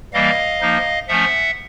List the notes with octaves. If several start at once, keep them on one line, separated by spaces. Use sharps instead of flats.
E3 G3 A#3 D#5 F5
F3 A#3 D#4
F3 A3 C#4 E5 F#5